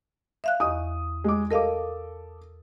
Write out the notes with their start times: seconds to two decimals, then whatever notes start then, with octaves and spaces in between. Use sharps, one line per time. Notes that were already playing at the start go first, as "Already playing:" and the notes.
0.44 E5 F5 F#6
0.60 E2 D#5 C#6 D#6
1.24 G#3 D6
1.51 A4 A#4 D#5 F5 D6